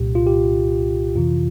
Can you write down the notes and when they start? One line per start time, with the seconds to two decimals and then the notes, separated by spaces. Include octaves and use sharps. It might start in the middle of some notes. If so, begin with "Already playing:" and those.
Already playing: C2 A#2 G4
0.15 F4
0.27 G4
1.15 F2 C3 E3 F4